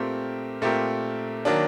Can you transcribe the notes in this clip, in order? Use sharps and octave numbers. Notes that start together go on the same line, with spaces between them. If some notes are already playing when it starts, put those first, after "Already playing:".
Already playing: A#2 A3 C4 G4 A#4
A#2 A3 C4 G4 A#4
D#3 F#3 A#3 D4